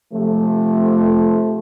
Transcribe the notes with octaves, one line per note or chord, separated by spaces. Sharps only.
C3 F3 A3